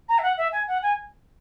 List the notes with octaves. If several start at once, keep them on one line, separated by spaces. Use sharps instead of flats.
A#5
E5
F#5
E5
G#5
F#5
G#5